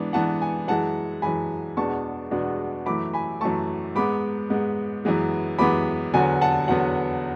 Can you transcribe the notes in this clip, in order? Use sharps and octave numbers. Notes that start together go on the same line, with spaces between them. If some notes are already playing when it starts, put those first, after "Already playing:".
Already playing: G#2 E3 B3 D4
G#2 E3 B3 D4 F#5 A5
G#5
F#2 E3 G#3 F#5 A5
F#2 E3 G#3 G#5 B5
E2 B2 G#3 B3 D4 A5 C#6
E2 B2 G#3 B3 D4
F#2 E3 A3 B5 D6
G#5 B5
F#2 E3 A3 A5 C#6
G#2 G#3 B3 B5 D6
G#2 G#3 B3
F#2 E3 G#3 B3
F#2 E3 G#3 B3 B5 D6
E2 D3 F#3 B3 G#5
F#5 A5
E2 D3 F#3 B3 F#5